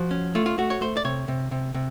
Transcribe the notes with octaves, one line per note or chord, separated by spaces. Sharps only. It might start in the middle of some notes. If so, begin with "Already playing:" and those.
Already playing: F3 F#4
C#4
A3 F4
F4
A3 F#4
C#5
A3 C5
D5
C3 C#5
C3
C3
C3